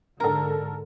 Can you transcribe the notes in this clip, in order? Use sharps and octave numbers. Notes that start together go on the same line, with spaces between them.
G#2 D3 A4 A#4 A#5